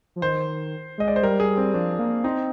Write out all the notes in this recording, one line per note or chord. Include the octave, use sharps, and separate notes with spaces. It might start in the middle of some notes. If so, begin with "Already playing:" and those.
F3
D#3 C5
G#3 D#5
D5
C5
G3 A#4
G#4
C4
F3 D4
A#3
C4 D#4